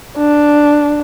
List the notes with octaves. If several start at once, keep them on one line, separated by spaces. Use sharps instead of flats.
D4